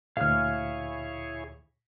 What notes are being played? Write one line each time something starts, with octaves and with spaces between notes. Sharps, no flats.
D2 A#2 E4 G#4 C#5 F5 F6